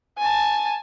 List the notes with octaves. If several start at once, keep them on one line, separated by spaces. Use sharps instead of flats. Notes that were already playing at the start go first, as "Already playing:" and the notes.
G#5 A5